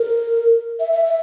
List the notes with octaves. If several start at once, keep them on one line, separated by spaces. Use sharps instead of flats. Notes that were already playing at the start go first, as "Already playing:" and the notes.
Already playing: A#4
E5
E5
E5